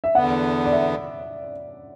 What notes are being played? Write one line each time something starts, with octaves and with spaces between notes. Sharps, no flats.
E5
E2 D3 B3 F#5
D5
E5